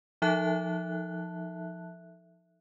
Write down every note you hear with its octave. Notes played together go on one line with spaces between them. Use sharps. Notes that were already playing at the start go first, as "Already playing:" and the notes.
F3 D#4 A4 E5 A5 F#6